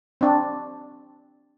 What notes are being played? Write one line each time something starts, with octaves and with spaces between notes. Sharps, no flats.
C4 D4